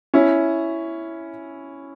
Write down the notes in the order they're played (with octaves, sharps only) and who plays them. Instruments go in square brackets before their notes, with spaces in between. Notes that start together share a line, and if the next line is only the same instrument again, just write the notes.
[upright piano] C#4 E4